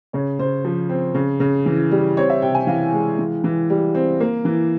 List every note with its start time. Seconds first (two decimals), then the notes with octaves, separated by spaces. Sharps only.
0.13 C#3 C#5
0.39 C#3 C5
0.65 F3
0.89 C4
1.14 C#3
1.40 C#3
1.66 E3
1.91 G3
2.17 C4 C#5
2.30 E5
2.42 C3 G5
2.55 G#5
2.67 E3 F5
2.93 G#3
3.19 E3
3.44 E3
3.70 G3
3.95 C4
4.20 A#3
4.45 E3